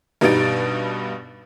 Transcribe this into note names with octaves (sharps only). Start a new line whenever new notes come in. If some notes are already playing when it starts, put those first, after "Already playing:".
G2 B2 G3 D#4 A6 D7